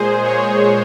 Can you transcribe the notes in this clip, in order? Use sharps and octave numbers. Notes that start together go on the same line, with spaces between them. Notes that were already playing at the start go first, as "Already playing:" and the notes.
Already playing: A#2 G#3 G#4 C5
C#5